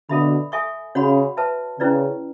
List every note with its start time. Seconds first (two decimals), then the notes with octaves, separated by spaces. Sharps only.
0.09 B2 D3 A4 E5 B5
0.52 A4 E5 G#5 C#6
0.95 C#3 F#4 C#5 F#5 B5
1.37 B4 E5 A5
1.79 C#3 C#4 E4 B4 D5